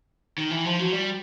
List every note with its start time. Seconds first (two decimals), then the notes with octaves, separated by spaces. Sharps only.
0.38 D#3
0.51 E3
0.65 F3
0.79 F#3
0.93 G3